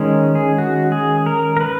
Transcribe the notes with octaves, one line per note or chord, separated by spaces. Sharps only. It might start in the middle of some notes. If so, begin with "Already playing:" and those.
Already playing: D#3 G#3 C#4
G#4
F#4
G#4
A#4
A#4
B4